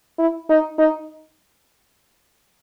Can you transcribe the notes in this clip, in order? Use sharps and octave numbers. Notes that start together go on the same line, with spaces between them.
E4
D#4
D#4